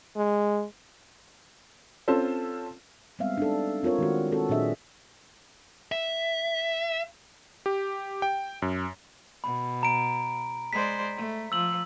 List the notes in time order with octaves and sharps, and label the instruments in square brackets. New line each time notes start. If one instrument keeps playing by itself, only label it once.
[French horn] G#3
[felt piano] C4 C#4 F4 A4 C5
[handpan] G3 G#3 B3 C4 E5 F5
D4 D#4 A4
C4 F4 A#4 C#5
D#3 G#3 E4 F#4
C4 F#4 A4
A#2 F#3 D4 G#4 D#5 E5
[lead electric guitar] E5
[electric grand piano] G4
G5
F#2
[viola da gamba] B2 [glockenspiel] B5
[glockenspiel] A#5 D7
[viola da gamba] G#3 C5 D5 [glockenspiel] B6
[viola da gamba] A3
[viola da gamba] F3 [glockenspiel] E6 F#7